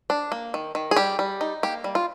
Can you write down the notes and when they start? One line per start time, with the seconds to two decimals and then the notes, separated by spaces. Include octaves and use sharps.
0.10 D4
0.32 A#3
0.54 D#3
0.75 D#3
0.91 G#4
0.96 G3 G4
1.19 G3
1.41 D#4
1.63 A#3 G4
1.84 G3
1.95 F4